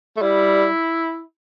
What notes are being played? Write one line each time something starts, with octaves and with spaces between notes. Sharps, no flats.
A3
G3 E4